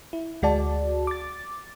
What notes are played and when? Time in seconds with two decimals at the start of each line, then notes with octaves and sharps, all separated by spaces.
0.13 E4
0.42 D2 G#3 F#4 D5 A5
1.07 D6 A6